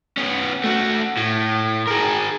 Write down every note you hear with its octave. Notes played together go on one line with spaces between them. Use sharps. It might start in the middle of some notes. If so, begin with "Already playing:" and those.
B3 C#4
A3 F#4
A2
G#4 A#4